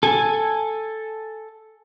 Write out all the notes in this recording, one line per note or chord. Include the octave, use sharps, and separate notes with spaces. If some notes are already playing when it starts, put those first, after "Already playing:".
A4 G#5